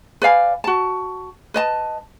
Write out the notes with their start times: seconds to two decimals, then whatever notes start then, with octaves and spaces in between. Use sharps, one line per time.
0.22 B4 D5 F5 G#5
0.64 F#4 A5
1.54 B4 D#5 A5